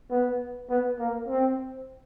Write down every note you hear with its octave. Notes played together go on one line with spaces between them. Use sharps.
B3
B3
A#3
C4